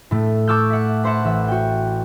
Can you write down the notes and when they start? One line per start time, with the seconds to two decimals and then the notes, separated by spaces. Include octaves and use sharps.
0.11 A2 A3
0.47 A5 C#6 D6 E6 F6 G6
0.70 E5 F#5
1.04 B4 C5 E5 F#5 A5
1.25 A1 E5
1.48 F#4 G5